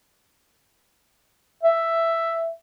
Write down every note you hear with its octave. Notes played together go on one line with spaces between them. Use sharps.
E5